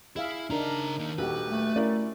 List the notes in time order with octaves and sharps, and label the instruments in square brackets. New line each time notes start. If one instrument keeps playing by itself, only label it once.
[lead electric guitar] E4 [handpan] G#4 E5 F5
[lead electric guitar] C#3 A#5 [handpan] D4 D#4 A#4
[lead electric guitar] D#3 A#3
[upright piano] D#1 [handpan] F#4 G4 [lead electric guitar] B4
[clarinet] A3
[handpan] C#4 [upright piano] E4 A#4 D5